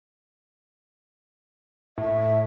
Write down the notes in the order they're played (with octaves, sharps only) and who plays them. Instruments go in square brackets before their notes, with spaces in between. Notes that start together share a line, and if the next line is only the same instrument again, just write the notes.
[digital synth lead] A2 [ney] E5